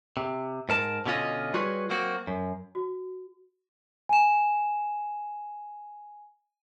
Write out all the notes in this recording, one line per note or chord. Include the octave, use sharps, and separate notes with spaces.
C3
G#2 A#4 A5
B2 D3 C#4 F4 D#5
G3 F4 F#4 G#4 B4 C#5
F#3 A#3 C4 F#4
F#2
F#4
G#5 E7